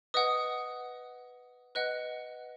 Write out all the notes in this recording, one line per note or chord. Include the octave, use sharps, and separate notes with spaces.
B4 D#5 F#5 D#6
B4 D#5 F#5 F#6